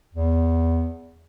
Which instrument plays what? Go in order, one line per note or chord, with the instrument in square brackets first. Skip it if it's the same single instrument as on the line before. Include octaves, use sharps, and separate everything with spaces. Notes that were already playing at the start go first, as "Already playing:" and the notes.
[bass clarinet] E2